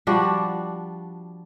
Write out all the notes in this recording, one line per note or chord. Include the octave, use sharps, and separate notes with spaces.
F3 G3 D4 F#4